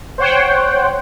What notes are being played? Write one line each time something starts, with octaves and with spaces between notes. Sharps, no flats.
C5 C#5 F#5 G5